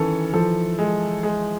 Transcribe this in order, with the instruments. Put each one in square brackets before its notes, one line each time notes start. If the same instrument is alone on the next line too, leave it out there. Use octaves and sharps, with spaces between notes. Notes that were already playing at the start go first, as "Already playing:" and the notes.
Already playing: [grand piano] D#3 E3 [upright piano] C#4 A4
[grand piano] F3 [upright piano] A4
[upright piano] G#3
G#3